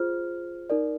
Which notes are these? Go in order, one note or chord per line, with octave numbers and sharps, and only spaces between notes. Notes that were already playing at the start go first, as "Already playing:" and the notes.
Already playing: F4 G#4 C5 F6
D#4 A#4 D5